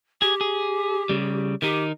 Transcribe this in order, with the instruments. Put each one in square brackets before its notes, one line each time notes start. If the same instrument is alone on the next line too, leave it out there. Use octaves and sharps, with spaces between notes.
[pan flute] G4 [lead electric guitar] G#4
[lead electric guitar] G#4
C#3 G3
[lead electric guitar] D#3 D#4 [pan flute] G4